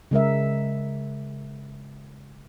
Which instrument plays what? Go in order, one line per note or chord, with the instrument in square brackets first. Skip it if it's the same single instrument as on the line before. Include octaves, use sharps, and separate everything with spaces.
[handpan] C#3 G#3 A#4 E5